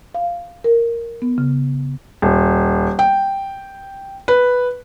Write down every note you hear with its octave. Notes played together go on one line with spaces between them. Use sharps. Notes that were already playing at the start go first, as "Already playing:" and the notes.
F5
A#4
B3
C#3
D#1
G5
B4